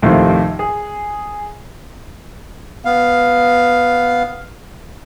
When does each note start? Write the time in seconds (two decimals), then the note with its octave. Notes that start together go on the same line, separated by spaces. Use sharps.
0.02 D#2 A2 C3 D#3 F3
0.59 G#4
2.85 B3 F5